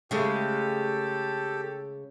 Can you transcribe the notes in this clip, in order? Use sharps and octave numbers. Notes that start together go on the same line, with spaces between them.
C#3 G#3 A3 G4 A4